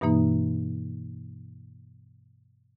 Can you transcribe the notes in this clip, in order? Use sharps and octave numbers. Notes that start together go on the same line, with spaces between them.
G2 B2 E3 A#3 D#4